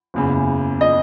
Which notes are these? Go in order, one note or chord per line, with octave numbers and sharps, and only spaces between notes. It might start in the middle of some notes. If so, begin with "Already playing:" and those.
F#1 E2 C#3
D#5